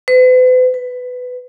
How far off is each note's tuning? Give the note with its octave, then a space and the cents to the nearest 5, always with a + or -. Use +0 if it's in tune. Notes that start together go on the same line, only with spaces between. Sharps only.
B4 +45
B4 +15